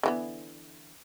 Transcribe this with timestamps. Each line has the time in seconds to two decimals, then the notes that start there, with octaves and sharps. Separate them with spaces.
0.03 D3 E3 B3